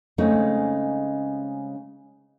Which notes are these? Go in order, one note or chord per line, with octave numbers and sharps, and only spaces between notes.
C#3 G#3 A3 C4 C#4 D#4